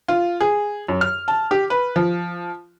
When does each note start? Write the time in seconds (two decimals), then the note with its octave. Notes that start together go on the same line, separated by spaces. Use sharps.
0.08 F4
0.40 G#4
0.88 F#2
1.01 F6
1.28 A5
1.51 G4
1.70 B4
1.96 F3